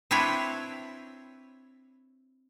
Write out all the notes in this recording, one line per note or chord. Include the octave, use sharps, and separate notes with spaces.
C4 D4 E4 B4 C#5